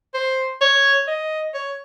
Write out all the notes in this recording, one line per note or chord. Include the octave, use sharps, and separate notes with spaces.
C5
C#5
D#5
C#5